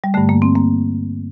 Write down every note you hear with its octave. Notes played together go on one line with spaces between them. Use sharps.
G3
G2 D3 A3
A#3
C4
A#3